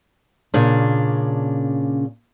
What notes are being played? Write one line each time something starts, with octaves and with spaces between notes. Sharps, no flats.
A#2 C#3 C#4 D4